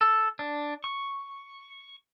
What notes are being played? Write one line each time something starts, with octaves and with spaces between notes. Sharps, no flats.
A4
D4
C#6